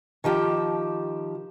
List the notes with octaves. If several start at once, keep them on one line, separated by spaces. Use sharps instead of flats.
D#3 F3 G4 A5